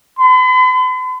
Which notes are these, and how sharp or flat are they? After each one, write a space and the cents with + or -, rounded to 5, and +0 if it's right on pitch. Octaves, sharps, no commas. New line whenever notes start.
B5 +45